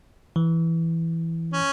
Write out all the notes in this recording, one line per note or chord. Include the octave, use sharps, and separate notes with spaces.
E3
C#4